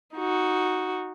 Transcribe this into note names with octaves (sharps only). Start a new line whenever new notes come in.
D#4 F#4